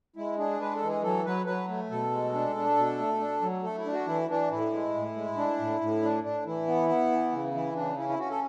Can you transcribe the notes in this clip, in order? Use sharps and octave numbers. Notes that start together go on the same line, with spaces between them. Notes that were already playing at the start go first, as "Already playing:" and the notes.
G#3 E4
D4 G#4
G#3 B4
A4
E3
G#4
F#3 A4
F#3 B4
F#3 B4
A3
B2 A4
G#3
D4
D4
B2
A3
D4
F#3
A3 A4
E4
D4
F#4
E3 E4
E3 D4
A2 E4
G#3
A2
G#3
D4
A2
A2
D4
D4
E3 E4
B3
B3
E3
C#3
E3 E4
C#3 D4
C#4 E4
E4
C#4 F#4
A4